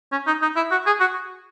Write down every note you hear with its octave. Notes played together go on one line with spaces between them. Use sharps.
C#4
D#4
D#4
E4
F#4
G#4
F#4